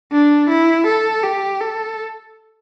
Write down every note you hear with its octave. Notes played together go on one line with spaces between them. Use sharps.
D4
E4
A4
G4
A4